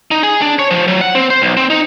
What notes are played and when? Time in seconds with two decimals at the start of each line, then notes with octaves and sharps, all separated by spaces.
0.11 D#4
0.23 G#4
0.42 D4
0.59 C#5
0.71 F3
0.88 F#3
1.01 F#5
1.15 C4
1.30 C5
1.42 B1
1.57 C4
1.70 D#4